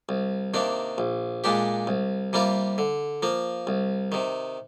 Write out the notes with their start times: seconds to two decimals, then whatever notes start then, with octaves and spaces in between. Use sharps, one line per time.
0.09 C2
0.54 C3 D#3 A#3 D4
0.98 A#1
1.44 A#2 G#3 D4 G4
1.87 C2
2.33 C3 G3 A#3 F4
2.78 D3
3.23 F3 A#3
3.67 C2
4.12 C3 D#3